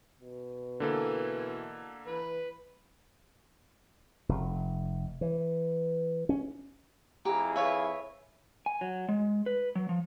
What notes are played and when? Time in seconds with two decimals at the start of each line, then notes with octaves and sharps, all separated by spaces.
0.21 B2
0.80 D3 E3 A#3 A4
2.07 E3 B4
4.29 F1
5.21 E3
6.29 C#4
7.25 F2 E4 G4 G#4 A#5
7.56 B4 C#5 E5 F5
8.66 G#5
8.81 F#3
9.09 G#3
9.46 B4
9.75 F#3
9.89 F3